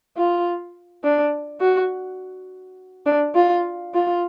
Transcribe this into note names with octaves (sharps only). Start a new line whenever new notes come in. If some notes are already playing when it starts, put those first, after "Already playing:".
F4
D4
F#4
D4
F4
F4